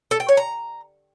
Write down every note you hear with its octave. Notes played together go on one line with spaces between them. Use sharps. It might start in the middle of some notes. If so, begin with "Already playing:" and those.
A4
G5
C#5
A#5